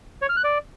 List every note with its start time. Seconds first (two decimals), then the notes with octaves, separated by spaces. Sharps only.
0.22 C#5
0.29 F6
0.37 F#6
0.44 D5